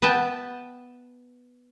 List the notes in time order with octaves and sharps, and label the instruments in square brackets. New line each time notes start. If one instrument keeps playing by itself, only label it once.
[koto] B3 B4 E5 G5 A5